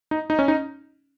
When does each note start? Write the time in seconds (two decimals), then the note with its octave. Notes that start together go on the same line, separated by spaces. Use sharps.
0.11 D#4
0.30 D#4
0.39 C#4
0.48 D#4